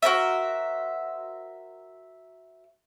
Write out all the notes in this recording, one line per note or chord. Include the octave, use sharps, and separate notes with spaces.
F#4 A#4 C5 E5